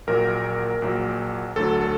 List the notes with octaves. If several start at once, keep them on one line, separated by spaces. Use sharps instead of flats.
A#1 A#2 F#3 A#4
A#1 A#2 F#3
D2 D3 F#3 A4
A4